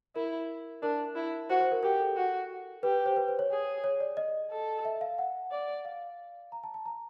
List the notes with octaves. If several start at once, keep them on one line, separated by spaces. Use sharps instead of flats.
E4 A#4
D4 A#4
E4
F#4 C5
C5
A#4
G4 A#4
A4
F#4
G4 B4
C5
B4
C5
C#5
G#4
C#5
D5
D#5
A4
E5
F5
F#5
D5
F5
A#5
A5
A5
A#5